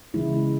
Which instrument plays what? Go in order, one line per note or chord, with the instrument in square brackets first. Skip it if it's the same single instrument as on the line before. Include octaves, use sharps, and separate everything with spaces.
[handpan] C#3 E3 G#3 E4